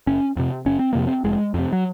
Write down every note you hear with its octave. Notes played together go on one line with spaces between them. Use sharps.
F#1 C#4
F2 C3
F#1 C#4
C4
F2 C3 A#3
C4
F1 G#3
F2 C3
F#3